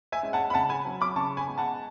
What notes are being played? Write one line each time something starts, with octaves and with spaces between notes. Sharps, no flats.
E5 G#5
G#3 C#4
F#5 A5
B5
C#3 F#5 A5
G#5 B5
F#3 C#4
B5 D6
C#3 A5 C#6
G#5 B5
G#3 B3
F#5 A5